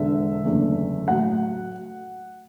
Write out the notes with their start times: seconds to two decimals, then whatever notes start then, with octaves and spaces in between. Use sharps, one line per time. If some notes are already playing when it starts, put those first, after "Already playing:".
Already playing: E1 E2 D3 E5
0.45 F#1 E2 D3 A3
1.08 A2 F#3 F#5